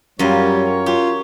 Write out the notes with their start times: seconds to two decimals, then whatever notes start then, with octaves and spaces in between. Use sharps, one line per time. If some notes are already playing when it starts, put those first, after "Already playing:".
0.19 F#2 G3 F4 A#4 C#5
0.86 F4 G4